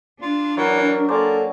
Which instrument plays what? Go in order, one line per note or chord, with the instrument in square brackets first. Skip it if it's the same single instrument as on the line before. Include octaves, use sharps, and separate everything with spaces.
[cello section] D4 [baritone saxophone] F4
[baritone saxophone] E3 [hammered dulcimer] F#3 [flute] A#4
[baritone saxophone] A#3 [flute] A4 [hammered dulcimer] C5 D5 G#5